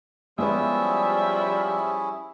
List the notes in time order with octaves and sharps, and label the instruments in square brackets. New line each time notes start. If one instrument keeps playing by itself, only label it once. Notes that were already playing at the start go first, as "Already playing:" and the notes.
[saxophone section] F3 E5 [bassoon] G3 [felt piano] G#3 B3 [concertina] C#4 E4 G#4